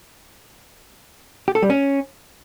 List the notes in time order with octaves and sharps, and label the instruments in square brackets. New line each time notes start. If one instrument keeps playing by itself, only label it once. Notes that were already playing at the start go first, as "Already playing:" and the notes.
[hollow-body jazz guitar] G4
A4
G3
C#4